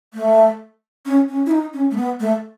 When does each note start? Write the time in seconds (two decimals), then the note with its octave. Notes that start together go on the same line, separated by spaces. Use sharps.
0.14 A3
1.06 C#4
1.28 C#4
1.46 E4
1.51 D#4
1.74 C#4
1.91 A3
1.97 B3
2.20 A3